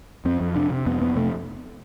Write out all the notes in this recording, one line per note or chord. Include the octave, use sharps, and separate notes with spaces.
F2 C4
F2
C3 D4
C3
F2 B3
F2 B3
C3 A3